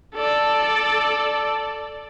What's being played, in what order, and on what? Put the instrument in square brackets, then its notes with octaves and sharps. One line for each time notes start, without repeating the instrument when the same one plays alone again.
[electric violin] A4 D5